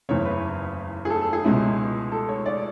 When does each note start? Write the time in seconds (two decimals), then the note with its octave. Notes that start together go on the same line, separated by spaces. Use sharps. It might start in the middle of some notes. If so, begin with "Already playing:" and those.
0.09 F#1 E2 C#3 C#5
0.25 B4
1.05 G#4
1.10 A4
1.21 A4
1.33 G#4
1.44 C#2 B2 G#3 C#4 E4
2.12 A4
2.29 C#5
2.46 D5